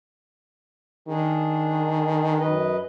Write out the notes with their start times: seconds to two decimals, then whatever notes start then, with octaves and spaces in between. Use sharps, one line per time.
1.08 D#3 D4 G#4
2.38 F#2 B4 D#5